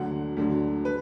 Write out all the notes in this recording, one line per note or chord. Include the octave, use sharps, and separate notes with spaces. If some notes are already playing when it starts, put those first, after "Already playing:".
Already playing: D2 D3 F#3 F#5
D2 D3 F#3
B4